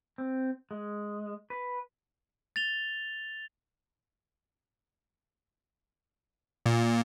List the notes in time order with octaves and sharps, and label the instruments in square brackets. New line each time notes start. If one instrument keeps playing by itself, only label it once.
[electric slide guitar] C4
G#3
B4
[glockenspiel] A6 F7 G7
[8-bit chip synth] A#2